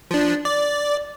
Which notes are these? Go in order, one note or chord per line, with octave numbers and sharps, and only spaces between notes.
F3 D4
D5